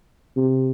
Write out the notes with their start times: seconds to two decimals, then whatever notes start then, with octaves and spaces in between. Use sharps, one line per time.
0.37 C3